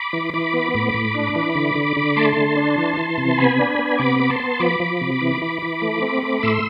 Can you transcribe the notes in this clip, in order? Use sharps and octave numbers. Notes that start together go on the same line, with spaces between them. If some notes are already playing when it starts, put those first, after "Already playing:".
Already playing: B5 D6
E3
E3 B5 D6
B3
A2
A2
D4
E3
D3
D3
D3
A3 A5 C6
D3
D4
E3
E3
C3
B3 G#5 B5
D4
B3
C3 B5 D6
B3
A5 C6
B3
F3 B5 D6
F3
C3
E3
E3
E3
A3
C4
A3
A2 C6 E6